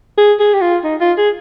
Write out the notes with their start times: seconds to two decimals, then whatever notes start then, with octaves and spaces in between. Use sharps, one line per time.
0.17 G#4
0.40 G#4
0.54 G4
0.61 F4
0.84 D#4
1.00 F4
1.17 G#4